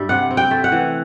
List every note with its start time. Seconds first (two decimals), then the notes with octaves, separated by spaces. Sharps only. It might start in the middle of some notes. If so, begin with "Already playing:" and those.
Already playing: G2 G3 E5
0.09 C3 F#5
0.31 C4
0.37 G5
0.51 A3
0.64 F#5
0.72 E3